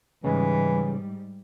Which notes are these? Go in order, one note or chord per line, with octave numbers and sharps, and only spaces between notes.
G#2 C#3 E3 G3 G#3